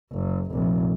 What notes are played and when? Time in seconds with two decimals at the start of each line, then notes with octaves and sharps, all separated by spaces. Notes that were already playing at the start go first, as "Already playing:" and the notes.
0.12 F#1
0.51 F1 A#1